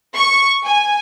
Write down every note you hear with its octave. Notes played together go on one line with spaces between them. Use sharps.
C#6
G#5